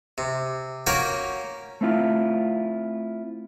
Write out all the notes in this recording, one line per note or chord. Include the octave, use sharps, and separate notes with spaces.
C3
A#3 C#4 F#4 A#4 G5
A3 C4 E4 F4